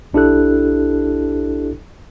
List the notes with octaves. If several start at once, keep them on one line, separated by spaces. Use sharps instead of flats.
B1 D4 E4 G4 A4 F#6